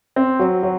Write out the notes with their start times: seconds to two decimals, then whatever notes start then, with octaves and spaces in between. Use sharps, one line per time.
0.16 C4
0.39 F#3
0.63 F#3